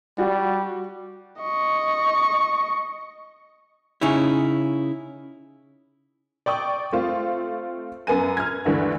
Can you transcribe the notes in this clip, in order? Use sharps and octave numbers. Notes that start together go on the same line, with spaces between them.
G3 F#4
D#5 C#6
C#3 C#4 D#4 E4
D5 G5 C#6 D#6
A3 C4 F4
F#2 B3 G#5 D#7
F6 G#6
D2 G2 D3 E3 A3